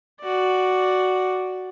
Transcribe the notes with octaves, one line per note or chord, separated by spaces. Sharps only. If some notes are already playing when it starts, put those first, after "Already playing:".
F#4 D5